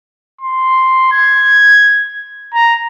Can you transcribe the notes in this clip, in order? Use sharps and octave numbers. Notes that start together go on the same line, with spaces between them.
C6
G#6
A#5